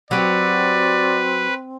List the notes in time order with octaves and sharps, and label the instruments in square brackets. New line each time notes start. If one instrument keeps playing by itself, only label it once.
[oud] F#3 G4 [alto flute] C4 [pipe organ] B4 [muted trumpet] D5